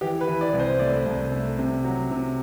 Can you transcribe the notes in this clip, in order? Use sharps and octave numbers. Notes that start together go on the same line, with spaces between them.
E3 G4
B4
E3
D5
C2
C5
A3 D5
C2
A3
C3
F#3
C3